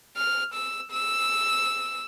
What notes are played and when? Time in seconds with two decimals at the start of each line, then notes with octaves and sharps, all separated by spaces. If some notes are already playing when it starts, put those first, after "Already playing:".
0.17 F6
0.54 E6
0.92 E6